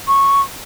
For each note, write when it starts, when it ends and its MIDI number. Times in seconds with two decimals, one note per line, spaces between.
0.08 0.41 85